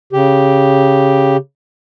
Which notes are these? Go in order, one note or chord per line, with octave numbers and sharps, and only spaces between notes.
C#3 G4